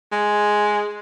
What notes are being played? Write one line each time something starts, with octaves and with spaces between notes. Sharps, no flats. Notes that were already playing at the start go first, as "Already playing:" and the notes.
G#3